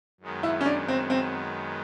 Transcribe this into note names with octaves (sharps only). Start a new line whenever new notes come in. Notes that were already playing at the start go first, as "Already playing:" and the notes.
F#2 D#3 G#3 B3
E4
C#4
D4
C4
C4